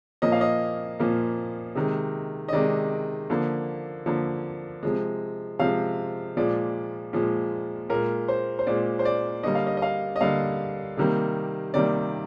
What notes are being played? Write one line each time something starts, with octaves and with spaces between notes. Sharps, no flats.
A#2 F3 A#3 D#5
F5
D#5
A#2 F3 A#3
C3 D#3 G#3
D#5
C3 D#3 G#3 D5
D3 F3 A#3
D3 F3 A#3
C3 F3 G#3
C3 F3 G#3 F5
A#2 F3 G#3 D5
A#2 F3 G#3
A#2 G#3 A#4
C5
C5
A#2 G#3 D5
C5
D5
D3 G3 A#3 D#5
F5
D#5
D#5
F5
D#5
D3 G3 A#3 F5
C3 D#3 G3 A#3
C3 D#3 G3 A#3 D5